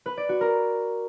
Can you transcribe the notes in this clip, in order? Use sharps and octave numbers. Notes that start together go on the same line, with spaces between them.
B4
D5
F#4
A#4